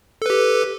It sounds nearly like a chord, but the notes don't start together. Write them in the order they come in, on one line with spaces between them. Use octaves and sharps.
A4 B4 G4